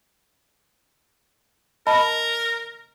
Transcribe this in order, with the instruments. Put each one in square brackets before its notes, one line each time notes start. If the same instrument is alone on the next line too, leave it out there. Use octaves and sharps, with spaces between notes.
[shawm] A#4 [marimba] D#5 A5 B5